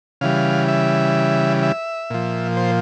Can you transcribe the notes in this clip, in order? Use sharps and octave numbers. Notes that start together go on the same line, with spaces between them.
C#3 E3 G3 F5
E5
E5
A#2 F3
C5